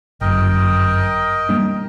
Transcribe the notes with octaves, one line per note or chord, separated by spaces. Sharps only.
G1 F#2 A#4 D#5 G5
G3 A#3 D4